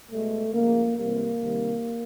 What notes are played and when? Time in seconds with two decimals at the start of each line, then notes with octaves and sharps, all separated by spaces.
0.09 B2 G#3 A3
0.52 C#3 F3 G#3 A#3
0.95 C3 E3 G3 A#3
1.39 C3 D#3 G3